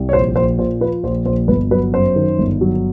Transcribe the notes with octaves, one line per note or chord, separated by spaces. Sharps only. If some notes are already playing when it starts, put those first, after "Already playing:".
Already playing: C2
C#5
A#1 C5
A#1 C5
A#2 C5
F3 B4
A#1 C5
A#1 C5
G1 B4
F#3 B4
F#2 C5
D#3
G1
F#3